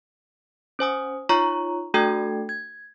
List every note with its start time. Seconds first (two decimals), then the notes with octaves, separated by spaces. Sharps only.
0.79 C#4 C5 G#5 D#6
1.29 D#4 F4 C#5 A#5 C#6
1.94 A3 D4 F#4 A4 G5 G#6
2.49 G#6